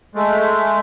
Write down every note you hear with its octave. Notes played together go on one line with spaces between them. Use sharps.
G#3 A3